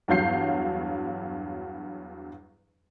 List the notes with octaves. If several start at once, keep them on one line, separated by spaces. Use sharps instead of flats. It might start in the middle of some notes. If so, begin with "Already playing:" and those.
E2 G2 F#3 F5 G6 C7